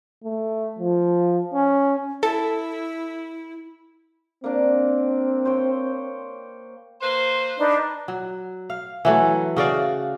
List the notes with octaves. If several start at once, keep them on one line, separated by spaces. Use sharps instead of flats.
A3
F3
C#4
E4 A4
A#3 C4 D4
C5 C#5 G5
A#3 B4 C5
D4 D#4 B4
F#3
F5
E3 F#3 A3
C#3 F#4 D5 F5